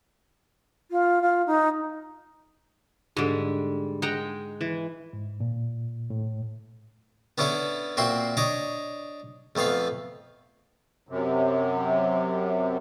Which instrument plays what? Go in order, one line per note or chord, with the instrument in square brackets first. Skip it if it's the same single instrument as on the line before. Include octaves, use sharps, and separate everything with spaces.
[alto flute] F4
F4
D#4
[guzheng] G#2 D3 [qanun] G3 G#3
[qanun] G#3 G5 [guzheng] D#4 F#5 A#5
[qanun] E3
[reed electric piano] G#2
A#2
A2
[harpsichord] B3 C#4 D4 E4 A4 B4
A#2 C4 F#4 E5 C6
D4 C#5 D#5 D6
F2 A3 B3 B4 F5
[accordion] F#2 C3